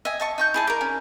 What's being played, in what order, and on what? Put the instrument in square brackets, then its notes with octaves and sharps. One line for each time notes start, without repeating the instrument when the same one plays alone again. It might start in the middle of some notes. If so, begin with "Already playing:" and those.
[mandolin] D#5 G#5 [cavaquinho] E5
[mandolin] D#5 A5 C#6
D#4 C#6 G6
[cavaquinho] E4 G#4 A5
A#4 D5
[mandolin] C#4